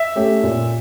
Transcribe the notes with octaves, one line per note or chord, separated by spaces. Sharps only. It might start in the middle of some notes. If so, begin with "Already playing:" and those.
Already playing: E5
A3 C#4 G4
A#2